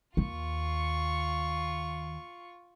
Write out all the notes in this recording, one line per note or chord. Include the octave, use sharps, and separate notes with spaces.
D#2 F4 C#6